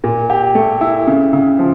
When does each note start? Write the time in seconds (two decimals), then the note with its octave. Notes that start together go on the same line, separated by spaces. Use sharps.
0.04 A#2
0.30 G4
0.55 A3
0.81 E4
1.07 C#3
1.33 C#3
1.59 F3